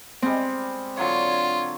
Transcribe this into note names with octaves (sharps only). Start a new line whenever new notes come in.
G3 G#3 C4
D3 F#3 F4 C#5